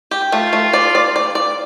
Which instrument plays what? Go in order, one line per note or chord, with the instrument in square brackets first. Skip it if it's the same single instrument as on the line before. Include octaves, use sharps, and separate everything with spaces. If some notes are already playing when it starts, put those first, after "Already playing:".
[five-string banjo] G4
[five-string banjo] A3 [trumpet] F4
[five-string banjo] A3
D5
D5
D5
D5